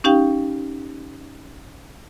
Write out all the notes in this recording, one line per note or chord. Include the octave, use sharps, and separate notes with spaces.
C#4 D#4 G4 F5 G5